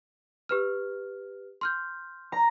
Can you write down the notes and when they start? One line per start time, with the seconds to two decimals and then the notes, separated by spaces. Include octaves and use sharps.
0.49 G4 B4 F6
1.61 C6 F6 G6
2.32 A#5